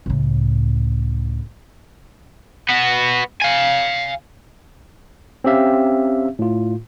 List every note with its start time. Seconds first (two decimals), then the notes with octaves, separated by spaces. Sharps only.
0.06 C#2 A2
2.69 B3 F#4
3.42 F5 G#5
5.44 C4 C#4 G4 E5 F5
6.39 A2 F4